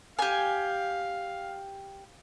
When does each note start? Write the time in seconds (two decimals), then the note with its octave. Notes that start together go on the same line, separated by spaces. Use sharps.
0.19 G4 F5 G#5